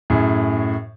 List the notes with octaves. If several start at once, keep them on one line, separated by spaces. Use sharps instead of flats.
F#2 A2 G#4